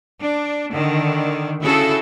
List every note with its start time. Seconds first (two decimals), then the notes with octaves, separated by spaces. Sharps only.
0.20 D4
0.71 D3 D#3
1.61 C#3 E4 F#4 G#4 A4